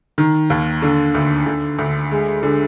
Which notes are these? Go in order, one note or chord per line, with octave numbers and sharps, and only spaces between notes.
D#3
D#2
D3
D2
D3
D2
G#3
D3